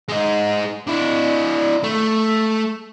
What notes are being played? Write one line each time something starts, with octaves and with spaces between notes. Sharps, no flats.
G#3 D#4
D4 E4
A3